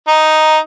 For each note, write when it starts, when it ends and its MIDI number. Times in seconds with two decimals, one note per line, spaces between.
0.08 0.58 63